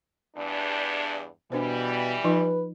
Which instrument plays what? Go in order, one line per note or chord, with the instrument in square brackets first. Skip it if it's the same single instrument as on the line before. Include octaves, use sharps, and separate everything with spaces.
[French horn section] E2 G2 D4
[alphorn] B2 [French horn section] E3 G3 [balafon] D4 B4 C5
[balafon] F3 D#4 F4 [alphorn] B4